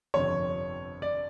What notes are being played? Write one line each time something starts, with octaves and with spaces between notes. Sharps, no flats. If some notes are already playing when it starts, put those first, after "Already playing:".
G1 F2 C3 C#5
D5